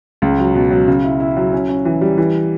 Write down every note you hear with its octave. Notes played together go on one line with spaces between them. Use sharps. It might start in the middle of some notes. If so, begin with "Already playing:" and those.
C#2
F#3
B2
F#3
C#3
E4
E4
F#3
C#4
C#4
E3
G3
E3